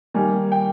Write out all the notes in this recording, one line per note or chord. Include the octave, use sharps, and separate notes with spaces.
D#3 G3 A#3 G#5
G5